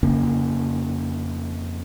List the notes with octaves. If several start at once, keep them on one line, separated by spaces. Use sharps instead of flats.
F2 C#3 A#3 C#4